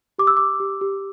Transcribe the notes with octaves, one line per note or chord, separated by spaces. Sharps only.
G4 D6
E6
G4 D6
G4
G4